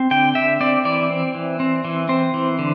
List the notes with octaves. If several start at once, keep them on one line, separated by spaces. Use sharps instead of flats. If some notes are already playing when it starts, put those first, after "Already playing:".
Already playing: C4
D3 G5
D3 E5
C4 D5
E3 D5
C4
E3
C4
E3
C4 C5
E3
D3